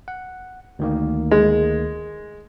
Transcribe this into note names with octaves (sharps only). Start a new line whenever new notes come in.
F#5
D2 D#3 A#3
G#3